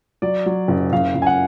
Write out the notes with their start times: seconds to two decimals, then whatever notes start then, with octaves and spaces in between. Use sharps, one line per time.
0.22 F#3 D5
0.46 F#3
0.68 F#1
0.93 F#1 F5
1.15 F#1
1.22 G#5
1.26 F#5